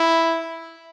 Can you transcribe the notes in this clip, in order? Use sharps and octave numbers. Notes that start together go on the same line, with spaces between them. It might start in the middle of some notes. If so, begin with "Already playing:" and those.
Already playing: E4